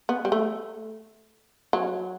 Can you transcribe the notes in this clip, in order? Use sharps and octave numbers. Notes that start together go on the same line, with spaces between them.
B3
G3
A3
F#3